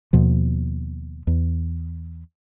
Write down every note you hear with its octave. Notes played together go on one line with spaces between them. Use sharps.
D#2 B2 F3
E2